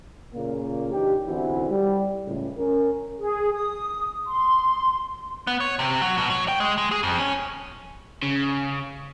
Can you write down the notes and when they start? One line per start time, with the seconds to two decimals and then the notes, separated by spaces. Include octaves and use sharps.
0.34 A#2 C#3 A#3
0.92 E3 D4 D#4 G4
1.26 B1 D3 E3 C4 E4 F#4
1.70 G3
2.26 C#2 A2
2.57 C#4 A#4
3.18 G#4
3.54 D#6
4.26 C6
5.47 B3
5.60 C#5
5.79 C3
6.02 F#3
6.18 B2
6.30 F#3
6.48 G5
6.60 G#3
6.78 G#3
6.91 G#4
7.03 F2
7.19 C#4
8.22 C#3